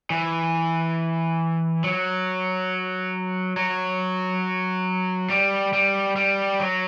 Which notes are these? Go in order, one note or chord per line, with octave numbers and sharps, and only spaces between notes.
E3
F#3
F#3
G3
G3
G3
F#3